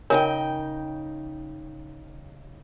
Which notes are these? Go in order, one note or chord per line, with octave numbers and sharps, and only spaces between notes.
C#3 D#4 A#4 C#5 G5 G#5